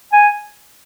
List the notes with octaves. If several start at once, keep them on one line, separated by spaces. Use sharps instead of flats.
G#5